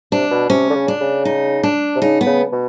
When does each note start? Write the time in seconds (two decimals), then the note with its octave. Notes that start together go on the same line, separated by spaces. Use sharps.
0.12 C3 D4
0.31 B2
0.49 C3 C#4
0.70 D3
0.75 C#3
0.88 D4
1.01 C#3
1.25 D#4
1.63 D4
1.96 C3
2.02 C#3 D#4
2.21 B3
2.26 C#3
2.52 B2